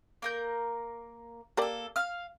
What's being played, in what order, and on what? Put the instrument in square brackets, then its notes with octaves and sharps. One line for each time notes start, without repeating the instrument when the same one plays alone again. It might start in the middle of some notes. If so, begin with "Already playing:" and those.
[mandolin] A#3 A#4 G6
[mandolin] A#3 A4 [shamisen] G4 A#4 D5
[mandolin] F5 F6